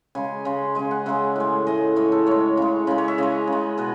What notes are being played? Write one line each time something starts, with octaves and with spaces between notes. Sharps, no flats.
C#3 G#3 G#5
C#3 G#3
C#3 G#3 G#5
F#5
C#3 G#3 E5
A2 G#3
A2 G#3 D#5
A2 G#3 C#5
A4
A2 G#3 C#5
C#3 G#3
C#3 G#3 D#5
C#5
E5
C#3 G#3 D#5
C#3
G#3
B2 B4